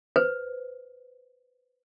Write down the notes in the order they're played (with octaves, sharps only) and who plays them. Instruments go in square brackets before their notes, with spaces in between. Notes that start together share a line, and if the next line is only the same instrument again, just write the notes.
[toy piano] B4 C5